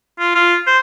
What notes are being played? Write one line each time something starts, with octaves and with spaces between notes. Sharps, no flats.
F4
F4
C5